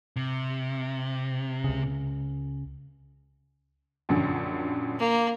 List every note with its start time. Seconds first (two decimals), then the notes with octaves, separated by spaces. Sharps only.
0.16 C3
1.64 C#2 C#3
4.09 A#1 F#2 D3
4.99 A#3